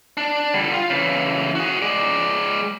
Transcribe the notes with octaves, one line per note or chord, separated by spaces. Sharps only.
D4
D3 G3
F4
C#3 E3
F#4 G#4
G#3 D5